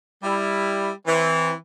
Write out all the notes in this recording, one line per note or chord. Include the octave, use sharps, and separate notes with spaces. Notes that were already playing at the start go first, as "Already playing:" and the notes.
G3 E4
E3 C4